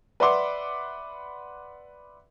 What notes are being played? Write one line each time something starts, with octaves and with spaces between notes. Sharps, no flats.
B4 D5 E5 F#5 C6 D6